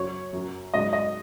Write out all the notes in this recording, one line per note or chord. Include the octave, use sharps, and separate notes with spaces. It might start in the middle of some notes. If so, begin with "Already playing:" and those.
Already playing: F#2 F#3 C#5
F#2 F#3
G#2 F#3 D#5
D#5